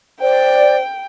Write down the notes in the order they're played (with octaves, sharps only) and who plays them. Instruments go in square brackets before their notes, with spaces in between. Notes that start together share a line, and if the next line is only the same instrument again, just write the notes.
[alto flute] C5 [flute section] D5 [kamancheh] G5